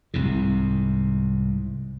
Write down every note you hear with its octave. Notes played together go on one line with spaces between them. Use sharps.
C2 G#2 C3